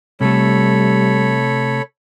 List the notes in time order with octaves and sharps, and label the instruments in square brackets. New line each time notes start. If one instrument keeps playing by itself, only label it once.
[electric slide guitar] C3 A3 [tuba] G3 [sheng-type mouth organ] A4 C#5 B5